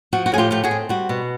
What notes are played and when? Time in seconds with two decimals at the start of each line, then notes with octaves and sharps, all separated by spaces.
0.13 F3 F#4
0.26 F#4
0.32 A2 G#4
0.38 F4 G4
0.51 A3 F4 G4
0.63 F#4 G#4
0.71 C4
0.89 G3 F#4
1.09 B2